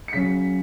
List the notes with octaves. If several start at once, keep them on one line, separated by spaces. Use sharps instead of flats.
C#7
C#3 F#3 C#4 B6